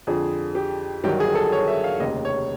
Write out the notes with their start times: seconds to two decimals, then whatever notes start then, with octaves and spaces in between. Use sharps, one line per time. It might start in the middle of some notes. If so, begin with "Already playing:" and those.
0.07 F2 D3 F3 G#4
0.55 G4
1.04 G1 G2 D#3 F#3 G4
1.20 G#4
1.35 A4
1.52 C#5
1.68 E5
1.84 F5
2.00 F1 D#2 C#3 D#5
2.25 C#5